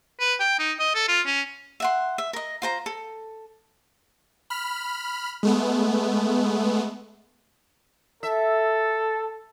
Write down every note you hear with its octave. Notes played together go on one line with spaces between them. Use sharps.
B4
G5
D#4
D#5
A4
F4
C#4
E5 F#5 C6
E5
A#4 D#5
F4 C5 A#5
A4
B5 F6
G#3 A3 B3
A4 E5